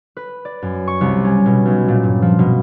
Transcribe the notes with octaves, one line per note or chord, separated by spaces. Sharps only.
B4
D5
F#2
C#6
C2
C#4
B2
B1
A#2
G2
F3
B2